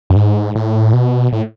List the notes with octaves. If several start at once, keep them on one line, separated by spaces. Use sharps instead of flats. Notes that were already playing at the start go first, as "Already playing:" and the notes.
F#2
G#2
A2
B2
A2